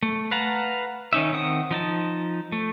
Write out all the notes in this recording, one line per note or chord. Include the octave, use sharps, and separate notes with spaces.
A3
B4 F5 F#5 A5 A#5
D#3 C#4 D#4 E5
D#3 C4 F#5 D#6
F3 D#4 A5
A3